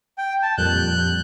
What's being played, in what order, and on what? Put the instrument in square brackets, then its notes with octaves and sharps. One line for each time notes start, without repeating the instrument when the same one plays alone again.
[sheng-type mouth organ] G5
A5
[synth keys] F2 A#2 G3 [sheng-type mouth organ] F#6 G6